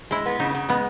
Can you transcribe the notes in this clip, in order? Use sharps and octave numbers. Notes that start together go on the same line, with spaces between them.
G#3 E4
B3
C#3 D#4
C#3
G#3 B3